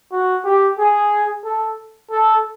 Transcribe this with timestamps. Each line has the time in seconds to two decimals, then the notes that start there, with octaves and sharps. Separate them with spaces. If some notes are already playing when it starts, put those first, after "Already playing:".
0.12 F#4
0.45 G4
0.79 G#4
1.45 A4
2.11 A4